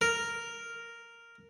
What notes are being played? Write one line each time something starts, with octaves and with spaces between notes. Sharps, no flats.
A#4